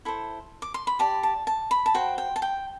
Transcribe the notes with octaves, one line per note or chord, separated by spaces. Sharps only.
E4 A4 C5
D6
C6
B5
G4 D5 A5
A5
A5
B5
A5
F#4 C5 G5
G5
A5
G5